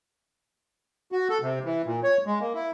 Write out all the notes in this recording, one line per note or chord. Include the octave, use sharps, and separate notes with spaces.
F#4
A4
C3
E3
A#2
C#5
G#3
A#3
E4